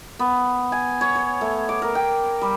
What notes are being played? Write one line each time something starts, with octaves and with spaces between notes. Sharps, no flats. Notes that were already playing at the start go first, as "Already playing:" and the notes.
B3
G#5
C#5
C#5
A3
D6
A#4
G5
G3